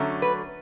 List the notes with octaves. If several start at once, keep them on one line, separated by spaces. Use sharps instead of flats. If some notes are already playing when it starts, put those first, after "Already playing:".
Already playing: D3 F#3 A3 C#4
B4